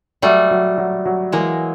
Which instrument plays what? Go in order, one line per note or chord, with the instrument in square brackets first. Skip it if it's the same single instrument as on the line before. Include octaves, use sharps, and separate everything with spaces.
[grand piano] F#3 [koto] G3 A3
[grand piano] F#3
F#3
F#3
[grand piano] E3 [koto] G#3 A#3